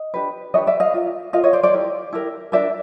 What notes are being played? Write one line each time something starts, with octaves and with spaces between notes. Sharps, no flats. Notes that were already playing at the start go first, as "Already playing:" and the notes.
Already playing: D#5
D4 G4 B4
D4 G4 B4 C#5 D#5
D5 E5
D#5 F5
F4 A#4
F4 A#4 D#5 F5
C#5 D#5
C5 D5
C5 D5
E4 G4 A#4
E4 G4 A#4
D4 G4 A#4 D5 E5